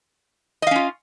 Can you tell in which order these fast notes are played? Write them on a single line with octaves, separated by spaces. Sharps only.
D#5 F5 C#4 F4